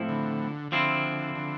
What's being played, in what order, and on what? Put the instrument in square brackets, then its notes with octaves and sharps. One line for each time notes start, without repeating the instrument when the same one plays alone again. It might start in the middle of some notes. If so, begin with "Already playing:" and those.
Already playing: [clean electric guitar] A2 F3 C4 E4
[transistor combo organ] D3
[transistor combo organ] D3 [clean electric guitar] F3 C4 E4
[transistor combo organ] D3